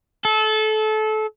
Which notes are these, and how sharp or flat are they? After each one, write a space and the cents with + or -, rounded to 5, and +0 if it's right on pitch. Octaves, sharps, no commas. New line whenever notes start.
A4 -25